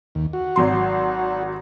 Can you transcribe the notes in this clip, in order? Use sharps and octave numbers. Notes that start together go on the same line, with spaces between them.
D#2
F#4
G#1 F#3 C6